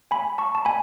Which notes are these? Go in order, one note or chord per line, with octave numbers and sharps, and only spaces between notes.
G#5 B5
A5 C#6
A5
G#5 B5